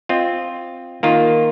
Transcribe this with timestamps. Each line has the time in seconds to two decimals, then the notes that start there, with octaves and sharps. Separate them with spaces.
0.09 C4 F4 D#5
1.03 D#3 A#3 F4